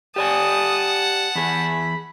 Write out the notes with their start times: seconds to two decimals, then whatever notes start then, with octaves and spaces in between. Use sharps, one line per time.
0.16 G4 D5 F#5 G#5 A5 D#6
1.35 E2 G#4 B5